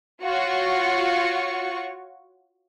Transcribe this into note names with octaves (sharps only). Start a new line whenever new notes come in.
F4 F#4 C#5 C#6